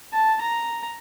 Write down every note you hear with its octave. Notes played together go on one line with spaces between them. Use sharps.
A5
A#5